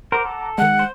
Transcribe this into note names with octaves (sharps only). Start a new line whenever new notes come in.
A#4 C5 F#5 A#5 D6
A4
D#3 G#3 F#5
C5